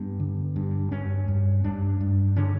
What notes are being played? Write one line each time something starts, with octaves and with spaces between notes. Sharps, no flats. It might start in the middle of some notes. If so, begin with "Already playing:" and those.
Already playing: G2 B3
D3
G2
G2 C#4
G2
G2 D4
G2
D3 C#4